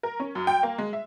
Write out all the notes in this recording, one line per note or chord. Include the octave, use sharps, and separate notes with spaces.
A#4
C#4
F#2
G5
A#3
G#3
E5